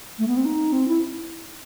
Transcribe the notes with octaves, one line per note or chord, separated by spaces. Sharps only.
A3
B3
C4
D#4
C4
E4